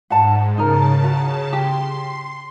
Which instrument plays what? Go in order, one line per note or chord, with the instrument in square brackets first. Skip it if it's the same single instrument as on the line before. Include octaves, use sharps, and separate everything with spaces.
[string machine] G#2 [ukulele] F#5 A5
[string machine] C#3 A5 [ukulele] D#4 A#4
[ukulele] F#4 A#5
[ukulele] G4 [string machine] C6